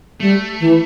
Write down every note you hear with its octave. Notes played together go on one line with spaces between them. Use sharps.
G3 A3
E3